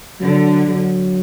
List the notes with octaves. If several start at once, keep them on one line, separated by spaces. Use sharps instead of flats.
D3 F#3
F#3